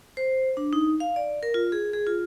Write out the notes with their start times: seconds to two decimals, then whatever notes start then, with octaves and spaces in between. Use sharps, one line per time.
0.17 C5
0.57 D4
0.73 D#4
1.00 F5
1.16 D5
1.43 A#4
1.54 F4
1.72 G#4
1.93 G#4
2.07 F4